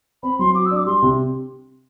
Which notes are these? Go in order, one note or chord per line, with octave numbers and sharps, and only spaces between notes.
C4 B5
F#3 C6
F#4 D6
E6
D4
D6
G3 C6
C3